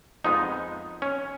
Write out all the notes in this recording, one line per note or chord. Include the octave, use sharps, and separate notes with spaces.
F2 F3 G#3 B3 D#4
C#4